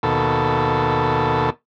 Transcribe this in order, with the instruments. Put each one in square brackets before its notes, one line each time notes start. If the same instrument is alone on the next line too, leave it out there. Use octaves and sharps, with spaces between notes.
[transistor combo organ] D#2 B2 A4